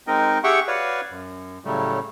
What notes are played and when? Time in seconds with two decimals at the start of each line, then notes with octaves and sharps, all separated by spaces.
0.07 G#3 C4 D#4 A#4 D#5
0.44 G4 G#4 E5 F#5 G5 C#6
0.68 F#4 B4 C#5 D5 F5
1.11 F#2
1.65 A2 C#3 F#3 G3 A3